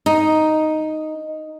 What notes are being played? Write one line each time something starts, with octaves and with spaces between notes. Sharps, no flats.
D#4